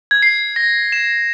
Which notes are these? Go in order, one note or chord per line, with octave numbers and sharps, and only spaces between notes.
G#6
C7
A#6
E7